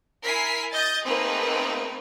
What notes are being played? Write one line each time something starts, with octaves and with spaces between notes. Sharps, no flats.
E4 A#4 G#5 B6 C7
D#5 G6 A6
A3 A#3 C4 D#4 G#4 B4